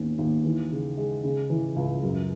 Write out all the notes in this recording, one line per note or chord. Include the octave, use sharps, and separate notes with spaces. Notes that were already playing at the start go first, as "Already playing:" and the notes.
Already playing: D#2 B3 C#4
D#2
E3
C#3
G#3
C#3
E3
C#2
F#2